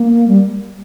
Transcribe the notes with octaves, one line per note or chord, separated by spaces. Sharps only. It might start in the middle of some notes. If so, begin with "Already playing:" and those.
Already playing: A#3
G3